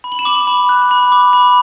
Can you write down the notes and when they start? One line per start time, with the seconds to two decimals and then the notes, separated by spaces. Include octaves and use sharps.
0.04 B5
0.12 F#7
0.19 E7
0.25 D6 F#7
0.47 B5
0.69 F#6
0.91 B5
1.12 D6
1.33 B5